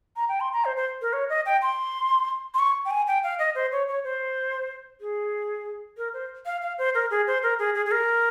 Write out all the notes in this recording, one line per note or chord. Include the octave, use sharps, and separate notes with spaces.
A#5
G5
C6
A#5
C5
C5
A#4
C#5
D#5
G5
C6
C6
C#6
G5
G#5
G5
F5
D#5
C5
C#5
C#5
C5
G#4
A#4
C5
F5
F5
C5
A#4
G#4
C5
A#4
G#4
G#4
G#4
A#4